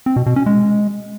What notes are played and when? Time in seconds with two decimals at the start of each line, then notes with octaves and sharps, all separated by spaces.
0.06 C4
0.16 B2
0.26 B2
0.36 C#4
0.46 G#3